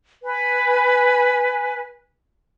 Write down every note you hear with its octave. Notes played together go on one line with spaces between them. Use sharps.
B4 G#5